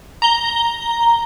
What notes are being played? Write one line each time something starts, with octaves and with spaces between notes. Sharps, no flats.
A#5 G7